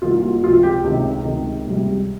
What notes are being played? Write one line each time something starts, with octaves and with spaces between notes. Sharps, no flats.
C2 C3 D#3 A#3 F4
F4
C#2 C3 F3 F4
G4
C#2 C3 D#3
C#2 C3 D#3
C#2 C3 G3